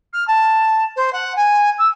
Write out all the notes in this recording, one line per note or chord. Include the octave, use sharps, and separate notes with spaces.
F6
A5
C5
F#5
G#5
E6